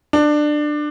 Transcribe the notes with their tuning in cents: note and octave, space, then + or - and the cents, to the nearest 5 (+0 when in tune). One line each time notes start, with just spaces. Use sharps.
D4 +20